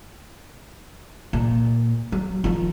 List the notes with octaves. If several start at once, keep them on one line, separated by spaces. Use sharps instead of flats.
A#2
F#3
D#3 F3